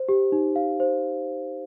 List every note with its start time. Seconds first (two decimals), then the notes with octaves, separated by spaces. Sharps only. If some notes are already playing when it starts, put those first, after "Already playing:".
Already playing: C5
0.09 G4
0.32 D#4
0.56 F5
0.80 C5